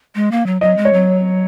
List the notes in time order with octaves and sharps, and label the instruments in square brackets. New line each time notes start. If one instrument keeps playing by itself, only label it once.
[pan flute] G#3
A#3
F#3
[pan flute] F#3 [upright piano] D#5
[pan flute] G#3
[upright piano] C#5
[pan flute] F#3